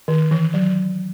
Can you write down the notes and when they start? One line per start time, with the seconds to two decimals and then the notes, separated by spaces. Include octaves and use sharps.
0.08 D#3
0.31 E3
0.54 F#3